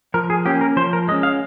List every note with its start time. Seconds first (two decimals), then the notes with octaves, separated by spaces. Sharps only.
0.14 F3 A#4
0.30 G#4
0.45 A#3 C#4 G4
0.61 A#4
0.76 F3 C5
0.93 A#4
1.08 G#3 D#5
1.12 C#4
1.23 F5